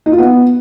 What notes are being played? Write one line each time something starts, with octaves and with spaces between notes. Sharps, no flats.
D#4
F4
B3